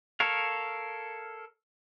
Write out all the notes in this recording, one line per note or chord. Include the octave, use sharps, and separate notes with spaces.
A4 A#4 C#5 F5